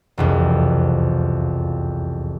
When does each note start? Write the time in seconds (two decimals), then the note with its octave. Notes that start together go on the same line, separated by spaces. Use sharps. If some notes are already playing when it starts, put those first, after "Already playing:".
0.18 E1 C2 F2